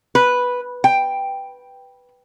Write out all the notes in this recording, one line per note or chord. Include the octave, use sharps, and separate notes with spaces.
B4
G5